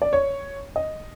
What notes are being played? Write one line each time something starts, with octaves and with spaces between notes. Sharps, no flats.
D5
C#5
D#5